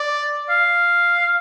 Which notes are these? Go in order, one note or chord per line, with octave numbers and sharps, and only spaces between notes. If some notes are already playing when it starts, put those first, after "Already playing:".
Already playing: D5
F5